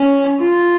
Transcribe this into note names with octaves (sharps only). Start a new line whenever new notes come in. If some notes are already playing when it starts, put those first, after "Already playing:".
Already playing: C#4
F4